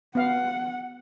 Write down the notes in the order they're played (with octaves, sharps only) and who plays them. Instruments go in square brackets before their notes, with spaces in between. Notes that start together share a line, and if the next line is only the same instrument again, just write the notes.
[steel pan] B3 F5 [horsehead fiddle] F#5